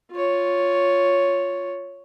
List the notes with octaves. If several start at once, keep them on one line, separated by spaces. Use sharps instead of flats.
F4 C#5